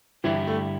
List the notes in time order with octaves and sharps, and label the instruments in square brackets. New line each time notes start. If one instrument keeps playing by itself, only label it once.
[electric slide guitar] G2 D3 G3 E4 G4 [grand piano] E3
[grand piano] A3